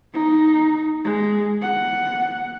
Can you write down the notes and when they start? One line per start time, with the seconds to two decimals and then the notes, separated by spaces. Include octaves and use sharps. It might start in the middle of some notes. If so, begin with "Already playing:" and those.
0.14 D#4
1.04 G#3
1.62 F#5